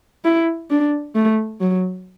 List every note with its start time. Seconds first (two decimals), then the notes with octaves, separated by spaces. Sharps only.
0.25 E4
0.70 D4
1.15 A3
1.61 F#3